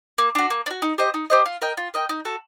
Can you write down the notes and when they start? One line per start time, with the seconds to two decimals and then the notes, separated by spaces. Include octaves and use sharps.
0.18 A#3
0.35 D4 F#4
0.50 A#3
0.66 D4
0.71 F#4
0.82 D#4
0.98 G4 C5 D#5
1.14 D#4
1.30 G4 C5 D#5
1.46 F4
1.62 A#4 D#5 G5
1.77 F4
1.94 A#4 D#5 G5
2.09 D#4
2.25 F#4 A4